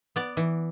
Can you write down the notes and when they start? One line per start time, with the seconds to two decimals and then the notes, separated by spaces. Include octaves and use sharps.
0.16 B3 D5
0.37 E3